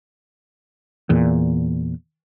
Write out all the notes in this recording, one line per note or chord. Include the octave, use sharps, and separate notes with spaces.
E2 A#2